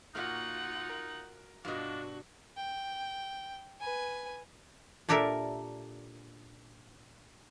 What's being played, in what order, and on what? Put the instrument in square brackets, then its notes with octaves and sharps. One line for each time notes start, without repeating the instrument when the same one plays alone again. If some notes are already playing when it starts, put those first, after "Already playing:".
[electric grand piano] A#2 F6 [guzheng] A#3 F#4 [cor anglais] D#4 [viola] F4 F#5
[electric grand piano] A#4
[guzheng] G2 B2 [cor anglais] D4 [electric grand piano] F4 D#5 [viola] F#4
[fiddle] G5
B4 G#5
[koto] A#2 D4 G4 A4 A#4 E5